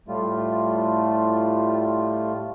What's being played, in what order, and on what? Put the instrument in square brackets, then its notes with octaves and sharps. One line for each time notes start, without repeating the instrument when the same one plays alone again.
[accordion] A2 G3 A3 F4